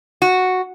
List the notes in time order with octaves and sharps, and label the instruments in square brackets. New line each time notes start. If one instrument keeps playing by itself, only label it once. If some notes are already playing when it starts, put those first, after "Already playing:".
[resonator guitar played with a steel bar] F#4